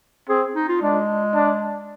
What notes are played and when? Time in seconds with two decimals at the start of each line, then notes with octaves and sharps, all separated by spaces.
0.29 C4 G#4
0.55 D#4
0.69 F4
0.82 G#3 D4
1.34 D4